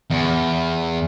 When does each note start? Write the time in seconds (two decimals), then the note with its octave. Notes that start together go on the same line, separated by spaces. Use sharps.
0.10 E2